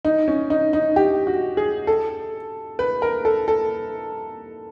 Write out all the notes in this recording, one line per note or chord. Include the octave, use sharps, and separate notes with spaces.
D#4
C#4
D#4
D#4
G4
F#4
G#4
A4
B4
A#4
A4
A4